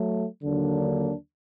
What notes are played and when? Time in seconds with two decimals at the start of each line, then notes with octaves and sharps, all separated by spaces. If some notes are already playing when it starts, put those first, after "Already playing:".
Already playing: F#3 A3
0.43 D#2 D3 F#3 A#3 D4